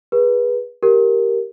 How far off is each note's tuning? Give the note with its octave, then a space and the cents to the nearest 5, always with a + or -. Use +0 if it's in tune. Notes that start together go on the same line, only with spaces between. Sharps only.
G#4 -25 B4 -25
G4 +0 A#4 +0